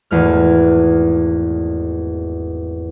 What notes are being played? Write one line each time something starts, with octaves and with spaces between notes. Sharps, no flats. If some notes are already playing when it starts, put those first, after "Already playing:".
G#1 E2 A3 F6